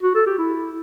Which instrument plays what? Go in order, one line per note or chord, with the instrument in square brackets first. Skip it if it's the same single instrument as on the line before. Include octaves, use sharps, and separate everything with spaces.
[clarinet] F#4
A4
G4
E4